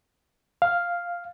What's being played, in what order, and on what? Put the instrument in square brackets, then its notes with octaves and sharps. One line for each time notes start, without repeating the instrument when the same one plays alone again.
[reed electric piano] F5